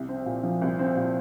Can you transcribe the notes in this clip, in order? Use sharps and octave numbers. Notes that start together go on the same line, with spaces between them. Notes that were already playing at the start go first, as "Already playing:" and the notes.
Already playing: C2
C4
A#2
F3
C2
C4
A#2